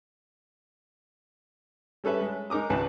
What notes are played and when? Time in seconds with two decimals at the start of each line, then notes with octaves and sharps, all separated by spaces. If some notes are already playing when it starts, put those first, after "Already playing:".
2.04 G3 C#4 A4 B4 E5
2.21 G#3
2.50 G#3 D#4 A#4 D6 D#6
2.70 G#1 C#2 B4 A5